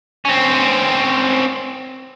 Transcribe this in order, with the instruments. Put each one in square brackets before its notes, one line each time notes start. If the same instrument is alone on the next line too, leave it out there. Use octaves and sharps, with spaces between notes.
[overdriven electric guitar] C4 C#4